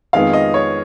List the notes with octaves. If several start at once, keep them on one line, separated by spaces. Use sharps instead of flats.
F2 D#3 G#3 B3 D#4 F5
D#5
C#5